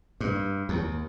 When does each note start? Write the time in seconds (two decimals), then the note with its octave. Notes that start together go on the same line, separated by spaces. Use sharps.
0.20 G2
0.69 D#2